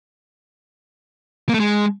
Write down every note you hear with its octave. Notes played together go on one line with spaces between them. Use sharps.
A#3
A3
G#3